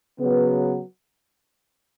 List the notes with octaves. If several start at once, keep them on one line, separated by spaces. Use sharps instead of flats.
C#3 F#3 B3